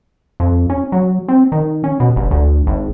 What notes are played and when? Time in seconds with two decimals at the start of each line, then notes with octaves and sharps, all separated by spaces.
0.40 F2
0.70 C#4
0.92 F#3
1.28 C4
1.52 D#3
1.84 C#4
2.00 B2
2.16 G1
2.31 D2
2.67 G#1